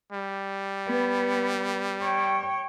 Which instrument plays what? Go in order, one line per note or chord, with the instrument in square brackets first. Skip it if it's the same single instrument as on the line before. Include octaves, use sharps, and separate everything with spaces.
[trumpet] G3
[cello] B3
C#5 G5